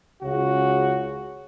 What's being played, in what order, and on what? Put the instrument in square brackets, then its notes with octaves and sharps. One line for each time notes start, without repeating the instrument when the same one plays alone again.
[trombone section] C#2 C#3 [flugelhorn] F#4